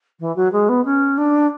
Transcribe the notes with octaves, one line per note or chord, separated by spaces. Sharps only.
E3
F#3
G#3
B3
C#4
D4